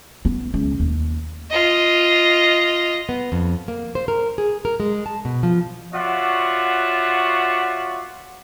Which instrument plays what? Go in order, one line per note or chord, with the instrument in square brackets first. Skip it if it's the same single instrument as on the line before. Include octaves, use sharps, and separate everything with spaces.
[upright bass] B3
C#2
D#2
[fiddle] F4 D#5
[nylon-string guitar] B3
F2
A#3
C5
A#4
G#4
A#4
G#3
A5
B2
F3
[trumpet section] F4 F#4 C#5 D5 E5 F#5